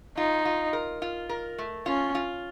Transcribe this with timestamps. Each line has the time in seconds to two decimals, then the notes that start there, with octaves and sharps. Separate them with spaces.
0.17 D#4 F4
0.45 F4
0.73 A#4
1.02 F4
1.29 A#4
1.58 A3
1.86 C#4 F4
2.15 F4